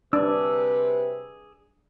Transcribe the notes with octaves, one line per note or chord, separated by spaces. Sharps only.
C3 D4 G#4 B4 D6 E6